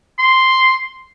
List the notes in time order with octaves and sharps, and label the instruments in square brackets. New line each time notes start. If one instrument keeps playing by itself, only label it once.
[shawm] C6